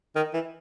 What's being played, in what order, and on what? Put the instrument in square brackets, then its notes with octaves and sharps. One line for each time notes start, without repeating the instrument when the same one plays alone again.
[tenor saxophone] D#3
E3